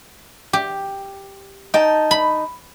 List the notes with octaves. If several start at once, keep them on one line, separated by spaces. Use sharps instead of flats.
G4
D#4 G5 A5
B5